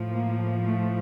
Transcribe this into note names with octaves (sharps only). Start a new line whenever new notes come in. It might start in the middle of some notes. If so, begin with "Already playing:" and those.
Already playing: A2 F3
A#3
A3